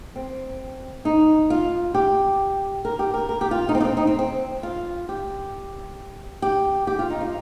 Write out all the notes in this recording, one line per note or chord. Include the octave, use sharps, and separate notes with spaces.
C4
D#4
F4
G4
A#4
G4
A#4
A#4
G4
F4
D#4
C4
D#4
C4
D#4
C4
C4
F4
G4
G4
G4
F4
D#4
F4